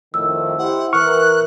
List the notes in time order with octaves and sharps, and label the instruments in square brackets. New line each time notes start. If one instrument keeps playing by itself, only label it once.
[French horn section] F2 A2 D#3 [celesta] E6
[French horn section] E4 G4 C5 [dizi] F#5
[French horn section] E3 A#4 [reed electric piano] C#6 F6 [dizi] F#6